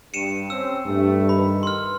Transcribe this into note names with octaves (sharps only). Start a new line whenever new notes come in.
G2 C#7 D#7 E7
C4 C#4 E6
G2 G3 A3
D#3 B4 B5
C6 F6